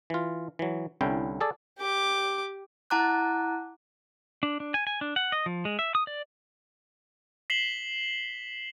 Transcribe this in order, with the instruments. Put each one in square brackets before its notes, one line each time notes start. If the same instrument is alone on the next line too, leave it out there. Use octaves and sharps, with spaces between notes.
[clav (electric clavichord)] E3 F4
E3 F#3
C2 D3 C#4 E4 G5
G#4 A4 D5
[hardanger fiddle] G4 D6
[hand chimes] E4 F#5 A5 A#5 D6 F#6
[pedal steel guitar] D4
D4
G#5
G#5
D4
F#5
D#5
F3
G#3
E5
D#6
D5
[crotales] B6 C7 E7 F#7 G7